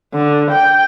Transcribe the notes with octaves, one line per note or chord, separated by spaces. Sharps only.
D3
G5